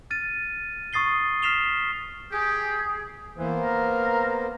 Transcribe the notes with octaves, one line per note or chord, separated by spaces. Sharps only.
F6 A6 D#7
C#6 D#6 A6 C7 G7
F6 B6 C7 E7 F7 G7
G4 G#4
E3 A#3 B3 C5
A#4